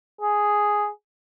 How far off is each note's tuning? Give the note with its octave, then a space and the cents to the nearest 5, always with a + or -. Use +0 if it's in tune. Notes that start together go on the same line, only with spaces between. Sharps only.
G#4 +0